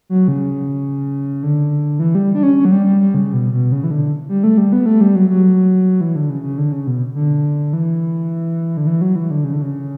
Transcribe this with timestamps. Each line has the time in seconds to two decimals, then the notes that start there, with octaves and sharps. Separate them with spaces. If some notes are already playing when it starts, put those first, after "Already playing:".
0.10 F#3
0.28 C#3
1.43 D3
1.99 E3
2.15 G3
2.35 D4
2.43 C#4
2.57 C#4
2.65 F#3
2.72 G3
2.86 G3
3.01 G3
3.14 C#3
3.34 B2
3.52 B2
3.72 C#3
3.84 E3
3.91 D3
4.29 G3
4.44 A3
4.58 G3
4.73 B3
4.86 A3
5.01 G3
5.15 F#3
5.30 F#3
6.01 E3
6.16 D3
6.30 C#3
6.43 C#3
6.58 D3
6.72 C#3
6.87 B2
7.15 D3
7.73 E3
8.77 D3
8.87 E3
9.01 F#3
9.16 E3
9.31 D3
9.44 C#3
9.53 D3
9.62 C#3